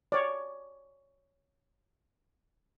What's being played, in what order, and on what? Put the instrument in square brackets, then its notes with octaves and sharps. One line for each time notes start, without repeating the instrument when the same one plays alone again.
[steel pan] C#5 D5